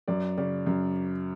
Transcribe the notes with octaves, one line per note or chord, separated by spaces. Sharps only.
F#2 D5
C#3 D5
F#2